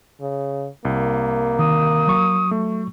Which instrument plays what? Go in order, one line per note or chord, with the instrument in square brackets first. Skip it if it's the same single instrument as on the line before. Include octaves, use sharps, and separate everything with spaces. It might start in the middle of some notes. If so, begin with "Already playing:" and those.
[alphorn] C#3
[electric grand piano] C2 [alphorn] A#3
[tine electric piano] D#3 [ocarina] D#6
[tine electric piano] F#3 C#6
[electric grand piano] A3